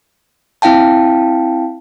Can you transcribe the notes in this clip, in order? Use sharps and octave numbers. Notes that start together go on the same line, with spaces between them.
C4 E4 F5 G5 A5